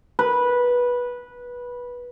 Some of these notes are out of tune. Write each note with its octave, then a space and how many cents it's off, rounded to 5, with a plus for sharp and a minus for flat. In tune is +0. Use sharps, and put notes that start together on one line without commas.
B4 -15